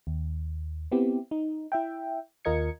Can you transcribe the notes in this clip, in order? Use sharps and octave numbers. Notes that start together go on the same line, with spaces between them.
D#2
B3 C4 E4 G4
D#4
E4 E5 G5
D#2 F4 A#4 D#5 G#6 C#7